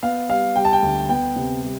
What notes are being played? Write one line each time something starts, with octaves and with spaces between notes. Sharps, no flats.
B3 F5
G3 F5
G3 G5
A5
G5
D2
B3 G5
C3
G3